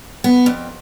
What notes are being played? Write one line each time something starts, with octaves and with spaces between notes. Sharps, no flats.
B3
F2